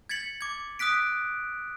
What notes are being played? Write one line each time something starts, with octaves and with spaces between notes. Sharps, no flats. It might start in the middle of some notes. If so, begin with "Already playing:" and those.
G#6 A6 B6 C#7 F#7
D6 G#6
D#6 E6 F#6 B6 D7